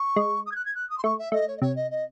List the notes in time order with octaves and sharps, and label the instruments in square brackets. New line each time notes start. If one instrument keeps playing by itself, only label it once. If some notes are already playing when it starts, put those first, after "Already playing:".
Already playing: [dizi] C#6
[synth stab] G#3
[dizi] D#6
G#6
F#6
G#6
F#6
D#6
C6
[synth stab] A3 [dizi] C#6
[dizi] E5
[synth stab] A3 [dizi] D#5
[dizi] C#5
D#5
[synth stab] C3 [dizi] C#5
[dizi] D#5
D#5